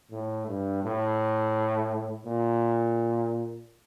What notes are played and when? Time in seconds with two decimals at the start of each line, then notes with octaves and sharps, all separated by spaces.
0.11 A2
0.48 G2
0.83 A2
2.26 A#2